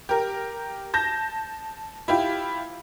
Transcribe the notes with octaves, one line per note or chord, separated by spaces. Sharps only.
G4 A#4
A5 G6 A#6
E4 F4 G4